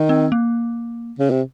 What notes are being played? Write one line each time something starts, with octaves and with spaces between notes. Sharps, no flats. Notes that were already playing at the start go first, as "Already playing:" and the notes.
Already playing: D#3
C4
A#3
C#3
C3